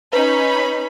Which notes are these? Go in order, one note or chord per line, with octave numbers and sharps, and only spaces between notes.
C#4 D#4 B4 B5